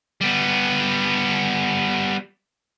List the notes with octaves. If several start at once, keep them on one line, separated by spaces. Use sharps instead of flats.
G3 B3